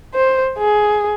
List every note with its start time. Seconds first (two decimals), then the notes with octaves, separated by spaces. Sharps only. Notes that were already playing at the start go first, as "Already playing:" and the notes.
0.14 C5
0.58 G#4